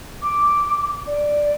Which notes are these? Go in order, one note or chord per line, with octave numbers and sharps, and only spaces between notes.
D6
D5